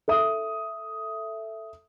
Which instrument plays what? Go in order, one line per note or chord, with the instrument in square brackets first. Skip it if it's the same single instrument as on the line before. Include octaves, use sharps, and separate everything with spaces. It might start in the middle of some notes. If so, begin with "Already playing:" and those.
[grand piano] A4 E5 D#6